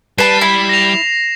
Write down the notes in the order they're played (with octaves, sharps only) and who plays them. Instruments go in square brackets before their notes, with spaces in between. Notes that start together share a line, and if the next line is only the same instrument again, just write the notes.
[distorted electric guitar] G3 [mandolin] B4 A5 [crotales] C7 E7
[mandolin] E4 B5
[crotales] A#6 F7